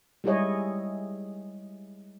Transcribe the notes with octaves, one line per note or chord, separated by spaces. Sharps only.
G3 G#3 E4 G#4 C#5 D#5